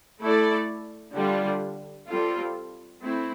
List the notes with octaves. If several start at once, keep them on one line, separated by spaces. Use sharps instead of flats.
A3 E4 A4 D5
D3 G3 D4 F4
G3 C4 F4 A4
A3 C4 E4